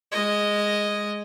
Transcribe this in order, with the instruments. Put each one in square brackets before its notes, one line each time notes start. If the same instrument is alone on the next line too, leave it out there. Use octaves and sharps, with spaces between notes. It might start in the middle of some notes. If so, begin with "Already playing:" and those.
[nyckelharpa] G#3 D#5